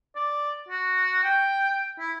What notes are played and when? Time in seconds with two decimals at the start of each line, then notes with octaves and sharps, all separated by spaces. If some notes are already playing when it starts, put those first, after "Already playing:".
0.16 D5
0.69 F#4
1.24 G5
1.99 E4